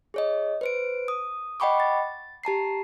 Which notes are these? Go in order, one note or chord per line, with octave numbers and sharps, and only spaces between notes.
G#4 C#5 D#5
B4 C5 D7
D#6
D#5 F#5 G5 B5 C#6 D6
A6
G4 A5 A#5 C7